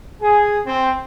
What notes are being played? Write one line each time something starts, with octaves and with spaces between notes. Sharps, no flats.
G#4
C4